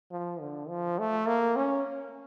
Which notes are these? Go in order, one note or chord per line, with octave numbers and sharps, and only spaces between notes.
F3
D3
F3
A3
A#3
C#4